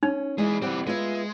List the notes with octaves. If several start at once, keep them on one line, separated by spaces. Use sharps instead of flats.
C#4 D#4
E3 G#3 E4 G#4 D#5
E3 G3 C4 D5 F#5
G#3 B3 F4 E5